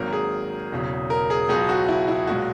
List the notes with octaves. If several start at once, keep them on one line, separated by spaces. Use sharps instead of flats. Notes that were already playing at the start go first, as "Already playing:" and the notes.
Already playing: G#1 G#2 D#3 F#3 A#3 A#4
G#4
E1 E2 C#3 F#3
A#4
G#4
C#2 B2 F#3 G#4
F#4
E4
E4
B1 A#2 G#3 F#4